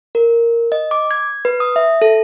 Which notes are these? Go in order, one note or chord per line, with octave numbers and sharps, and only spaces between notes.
A#4
D#5
D6
G#6
B4
D#6
E5
A4